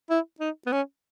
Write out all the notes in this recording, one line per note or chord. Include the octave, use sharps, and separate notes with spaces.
E4
D#4
B3
C#4